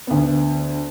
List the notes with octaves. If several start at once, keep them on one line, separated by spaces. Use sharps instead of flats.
D2 B3